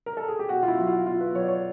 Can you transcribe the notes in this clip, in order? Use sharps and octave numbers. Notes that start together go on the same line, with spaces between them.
A#4
A4
G#4
G4
B2 F#4
F4
E4
F#3 F#4
F4
B2 F4
B4
F#3 C#5
D5
C#5